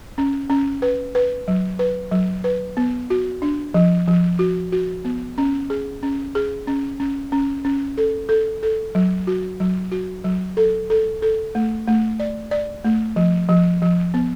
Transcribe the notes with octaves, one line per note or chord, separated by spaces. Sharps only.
C#4
C#4
B4
B4
F#3
B4
F#3
B4
B3
F#4
D4
F3
F3
F#4
F#4
B3
C#4
G#4
C#4
G#4
C#4
C#4
C#4
C#4
A4
A4
A4
F#3
F#4
F#3
F#4
F#3
A4
A4
A4
A3
A3
D5
D5
A3
F3
F3
F3
B3